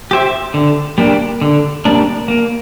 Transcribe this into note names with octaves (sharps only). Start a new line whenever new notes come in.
G4 C5 E5
D3
G3 A#3 D4
D3
G3 A#3 D4
A#3